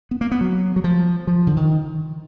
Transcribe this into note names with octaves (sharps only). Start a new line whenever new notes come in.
B3
A#3
B3
F#3
F#3
F3
F3
D3
D#3